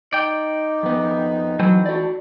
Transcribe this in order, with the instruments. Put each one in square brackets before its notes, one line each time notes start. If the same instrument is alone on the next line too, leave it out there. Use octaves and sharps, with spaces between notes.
[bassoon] D#4 [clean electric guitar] D5 G5
[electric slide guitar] F2 B3
[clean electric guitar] E3 A3 C4 [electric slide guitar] F#3
[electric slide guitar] F#4 D5